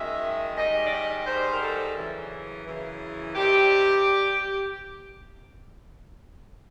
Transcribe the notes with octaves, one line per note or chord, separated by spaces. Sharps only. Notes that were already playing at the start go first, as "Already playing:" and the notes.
Already playing: F#2 D#3 G#3 E5
G#2 D#3 G3 D#5
D5
D#5
G#2 D#3 G3 C5
A#4
A4
F#2 C#3 E3
F#2 C#3 E3
C3 D#3 G3 G4